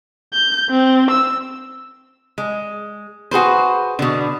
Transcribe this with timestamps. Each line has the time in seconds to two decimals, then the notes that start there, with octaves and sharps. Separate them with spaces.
0.33 G6
0.70 C4
1.11 E6
2.38 G#3
3.31 F#4 G#4 B4 C5
3.99 B2 D3